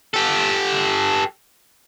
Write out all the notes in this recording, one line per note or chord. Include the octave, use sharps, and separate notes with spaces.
G4 A4